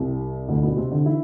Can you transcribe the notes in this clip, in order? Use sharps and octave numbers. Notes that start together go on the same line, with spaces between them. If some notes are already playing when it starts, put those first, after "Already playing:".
Already playing: C2 C3
D2 D3
B2 B3
C3 C4
D3 D4
E3 E4